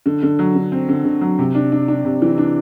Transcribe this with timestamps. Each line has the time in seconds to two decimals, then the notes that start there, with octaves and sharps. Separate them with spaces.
0.06 D3
0.23 D3
0.39 F#3
0.55 D3
0.72 C4
0.89 D3
1.05 D3
1.21 F#3
1.39 C3
1.55 D4
1.72 D4
1.88 D4
2.05 C3
2.22 E3
2.38 D4